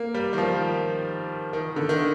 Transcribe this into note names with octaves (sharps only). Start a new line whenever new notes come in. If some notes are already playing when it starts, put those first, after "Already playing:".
Already playing: A#3
G3
D#3
F3
D#3
D3
D#3